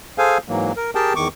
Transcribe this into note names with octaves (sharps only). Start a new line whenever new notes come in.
G#4 A4 C5 F5 G#5
G#2 E3 F#3 A#3
A#4
G4 G#4 A#4 G5 A5
E2 D#3 C#6 D6